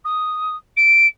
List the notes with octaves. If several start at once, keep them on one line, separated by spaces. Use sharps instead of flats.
D#6
D7